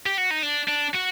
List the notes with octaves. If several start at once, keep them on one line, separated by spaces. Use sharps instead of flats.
G4
F#4
D#4
D4
D4
F#4